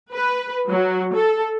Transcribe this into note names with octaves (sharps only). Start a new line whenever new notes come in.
B4
F#3
A4